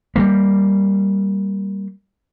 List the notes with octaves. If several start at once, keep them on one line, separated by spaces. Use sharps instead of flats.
G3 A3 A#3